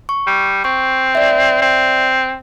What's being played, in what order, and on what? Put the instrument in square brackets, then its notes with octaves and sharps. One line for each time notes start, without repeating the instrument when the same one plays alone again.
[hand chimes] C#6
[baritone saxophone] G3
[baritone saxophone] C4 [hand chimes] C#6
[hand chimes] D5 E5
[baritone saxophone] C4